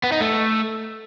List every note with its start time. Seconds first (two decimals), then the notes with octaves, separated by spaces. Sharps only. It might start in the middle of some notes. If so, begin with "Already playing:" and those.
0.04 B3
0.12 D#4
0.21 A3